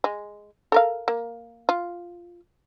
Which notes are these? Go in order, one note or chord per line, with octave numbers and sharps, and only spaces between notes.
G#3
A4 A#4 F5
A#3
F4